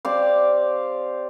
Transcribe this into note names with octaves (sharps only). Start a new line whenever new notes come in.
C4 G4 D5 F5